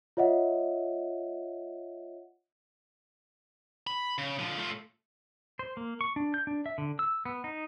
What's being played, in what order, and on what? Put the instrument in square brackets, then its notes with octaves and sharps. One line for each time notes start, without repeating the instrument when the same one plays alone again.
[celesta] F4 C#5 D#5 E5 F#5
[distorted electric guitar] B5
C#3
D3 F3
A3 F4
[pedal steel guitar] C5
A#3
C#6
D4
G6
D4
E5
D3
E6
B3
D#4